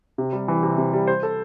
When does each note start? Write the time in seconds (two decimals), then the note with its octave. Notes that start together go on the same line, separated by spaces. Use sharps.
0.18 C3
0.33 G3
0.48 E3
0.63 C3
0.78 C3
0.93 G3
1.07 C5
1.23 A4